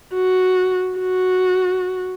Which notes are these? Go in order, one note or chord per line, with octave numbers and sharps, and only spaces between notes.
F#4
F#4